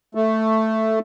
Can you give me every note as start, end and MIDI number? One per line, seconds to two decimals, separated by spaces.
0.15 0.99 57